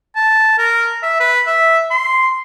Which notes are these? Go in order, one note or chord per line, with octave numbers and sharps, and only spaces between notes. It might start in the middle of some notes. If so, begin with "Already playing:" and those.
A5
A#4
E5
B4
E5
C6